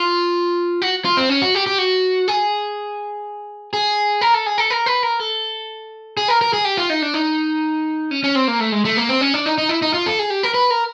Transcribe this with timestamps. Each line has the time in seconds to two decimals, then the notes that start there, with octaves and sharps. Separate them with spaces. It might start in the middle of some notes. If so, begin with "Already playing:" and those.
Already playing: F4
0.82 F#4
1.05 F4
1.17 C4
1.30 C#4
1.42 F#4
1.55 G4
1.67 G4
1.78 F#4
2.28 G#4
3.73 G#4
4.21 A#4
4.34 A4
4.46 G#4
4.58 A4
4.70 A#4
4.86 B4
5.03 A#4
5.20 A4
6.17 G#4
6.28 A#4
6.41 A#4
6.53 G#4
6.65 G4
6.77 F4
6.90 D#4
7.02 D4
7.14 D#4
8.11 C#4
8.24 C#4
8.35 C4
8.48 A#3
8.60 A3
8.72 G#3
8.85 A3
8.97 A#3
9.09 C4
9.21 C#4
9.34 D4
9.46 D#4
9.58 D#4
9.69 E4
9.82 D#4
9.94 F4
10.06 A4
10.19 G#4
10.30 G4
10.43 A#4
10.54 B4
10.71 A#4